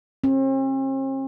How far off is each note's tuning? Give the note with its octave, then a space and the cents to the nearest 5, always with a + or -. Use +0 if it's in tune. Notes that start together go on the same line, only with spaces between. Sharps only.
C4 +45